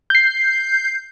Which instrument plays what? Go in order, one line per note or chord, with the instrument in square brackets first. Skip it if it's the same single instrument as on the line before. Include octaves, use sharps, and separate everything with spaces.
[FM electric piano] G6 C7